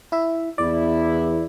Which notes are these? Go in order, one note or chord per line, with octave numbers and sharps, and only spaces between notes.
E4 E5
E2 E4 D5